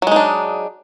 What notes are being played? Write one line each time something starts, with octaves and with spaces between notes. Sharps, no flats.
F#3 G#3 D4 D#4